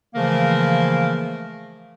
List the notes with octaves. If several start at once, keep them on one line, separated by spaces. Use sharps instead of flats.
C#3 E3 F3 A3 A#3 A#4